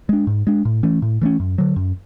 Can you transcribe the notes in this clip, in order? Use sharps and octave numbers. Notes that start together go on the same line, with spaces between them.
G#3 D4
G#2
G#3 D4
A2
E3 A3 C#4
A2
E3 A3 C#4
F#2
D3 F#3
F#2